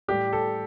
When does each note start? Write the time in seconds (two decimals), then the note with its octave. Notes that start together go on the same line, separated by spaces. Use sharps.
0.08 A2 G3 G4
0.33 A4